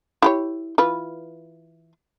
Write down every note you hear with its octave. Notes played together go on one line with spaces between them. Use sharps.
E4 G4 C#5
E3 F4 B4